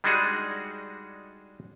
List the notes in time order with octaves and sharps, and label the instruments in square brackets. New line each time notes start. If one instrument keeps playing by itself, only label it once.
[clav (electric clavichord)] G3 G#3 D4 D#4 F#4 G#4